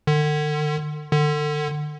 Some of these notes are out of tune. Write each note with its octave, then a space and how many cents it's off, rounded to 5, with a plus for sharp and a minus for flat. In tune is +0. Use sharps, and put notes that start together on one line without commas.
D3 +40
D3 +30